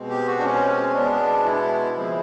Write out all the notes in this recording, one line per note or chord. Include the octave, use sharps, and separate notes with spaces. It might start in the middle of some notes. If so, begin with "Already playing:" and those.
Already playing: B2 G#3 C4
G4
F#4
D4
C#4
B2 G#3 B3 D4
E4
C#3 F3 G#3 C4